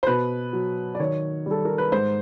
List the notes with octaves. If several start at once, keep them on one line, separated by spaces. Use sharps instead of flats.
C5
B2 B4
F#3
D5
D#3 C#5
G3 A4
A#4
B4
G#2 C5